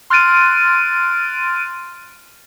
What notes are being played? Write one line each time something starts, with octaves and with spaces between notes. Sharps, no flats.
C6 F6 F#6 A6 D7 D#7